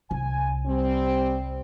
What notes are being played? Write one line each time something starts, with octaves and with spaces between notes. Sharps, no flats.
C2 G#5
G3 C4